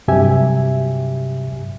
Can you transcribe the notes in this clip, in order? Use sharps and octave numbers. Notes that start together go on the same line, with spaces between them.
G2 C3 F#3 G4 E5 G#5